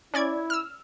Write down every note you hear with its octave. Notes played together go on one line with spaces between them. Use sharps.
C#4 E4 D5 G#6
E6 F6